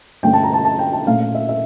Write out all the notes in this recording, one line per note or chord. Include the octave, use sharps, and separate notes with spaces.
G2 D3 A3 C#4 G5
A5
A#5
A5
A5
G5
A5
A#2 A3 C#4 F5
F5
E5
E5